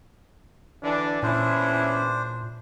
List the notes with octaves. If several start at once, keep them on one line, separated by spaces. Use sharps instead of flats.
D3 E3 D4
E2 A#2 C#4 D4 E4 C5